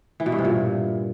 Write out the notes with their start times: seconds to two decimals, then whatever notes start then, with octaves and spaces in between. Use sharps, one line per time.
0.20 E3
0.26 B2
0.32 G2
0.38 C3
0.45 A#2